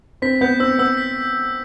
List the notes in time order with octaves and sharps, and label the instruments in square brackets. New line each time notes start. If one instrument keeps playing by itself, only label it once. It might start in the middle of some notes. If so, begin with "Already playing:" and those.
[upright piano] C4 [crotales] B6
[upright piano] B3 [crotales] G6
[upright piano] C4 [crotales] E6
[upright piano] B3 [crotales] E6
[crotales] B6